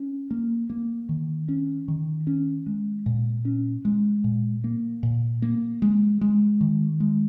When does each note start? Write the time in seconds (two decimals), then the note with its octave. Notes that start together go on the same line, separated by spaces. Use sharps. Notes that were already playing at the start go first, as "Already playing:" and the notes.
Already playing: C#4
0.31 A#3
0.70 A#3
1.09 D#3
1.49 C#4
1.88 D#3
2.27 C#4
2.67 G#3
3.06 A#2
3.45 C#4
3.85 G#3
4.24 A#2
4.64 A#3
5.03 A#2
5.42 A#3
5.82 G#3
6.21 G#3
6.61 D#3
7.00 G#3